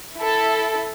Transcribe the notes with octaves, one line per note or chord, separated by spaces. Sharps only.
E4 A4